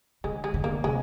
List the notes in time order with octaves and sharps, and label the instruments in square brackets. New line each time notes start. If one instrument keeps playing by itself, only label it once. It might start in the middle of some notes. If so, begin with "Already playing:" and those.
[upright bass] D3 [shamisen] G#3
[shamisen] G#3
[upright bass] D3
[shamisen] A#3
[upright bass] C3 [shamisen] G#3